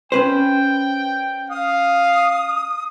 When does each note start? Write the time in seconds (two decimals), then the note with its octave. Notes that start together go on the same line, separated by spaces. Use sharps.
0.12 C#4 B4 C5 G5
1.50 F5 D#6